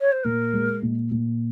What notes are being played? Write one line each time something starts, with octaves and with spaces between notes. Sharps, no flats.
C#5
C5
A#2 A#4
G#3
A#2
A#2